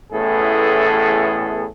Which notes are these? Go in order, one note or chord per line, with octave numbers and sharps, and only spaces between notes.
A1 E2 A2 B3 G#4 A4